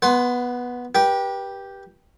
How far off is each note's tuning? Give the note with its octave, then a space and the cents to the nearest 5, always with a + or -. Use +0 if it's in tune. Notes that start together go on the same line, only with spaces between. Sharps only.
B3 -10 B4 +20 C6 +0
G4 +0 B4 -35